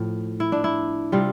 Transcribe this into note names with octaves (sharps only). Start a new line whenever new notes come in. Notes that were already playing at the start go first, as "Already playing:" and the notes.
Already playing: A2 F3
E4
D4
E4
C3 G3 F4